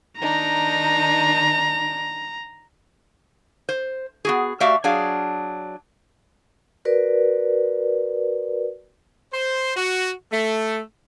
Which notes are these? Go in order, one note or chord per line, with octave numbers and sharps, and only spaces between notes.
D#3 D4 D#4 A#5
C5
B3 F#4 G#4
A3 F#4 G4 D5 E5 F5
F#3 D4 G#4 F5
F#4 A#4 B4 D5
C5
F#4
A3